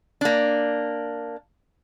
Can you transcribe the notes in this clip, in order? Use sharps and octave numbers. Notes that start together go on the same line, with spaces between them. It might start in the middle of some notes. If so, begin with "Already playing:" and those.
A#3 D4